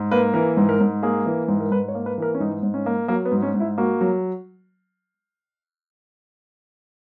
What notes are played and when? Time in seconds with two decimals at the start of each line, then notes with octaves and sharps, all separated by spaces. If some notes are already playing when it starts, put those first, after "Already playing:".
Already playing: G#2
0.11 A#3 B4
0.34 E3 A#4
0.57 G#2
0.69 A#4
0.81 G#2
1.03 A#3 G#4
1.26 E3
1.48 G#2
1.60 A#4
1.71 G#2 B4
1.88 C#5
1.95 A#3
2.06 B4
2.18 E3 A#4
2.35 C#4
2.40 G#2 D#4
2.63 G#2
2.74 C#4
2.86 A#3
3.08 F#3 A#3
3.25 B3
3.32 G#2
3.42 C#4
3.54 G#2
3.60 E4
3.78 A#3 F#4
4.01 F#3